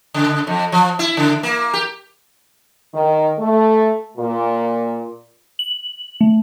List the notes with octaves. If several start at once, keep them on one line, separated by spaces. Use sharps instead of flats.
C#3
F2
F3
E4
C#3
A#3
G4
D#3
A3
A#2
F#7
A3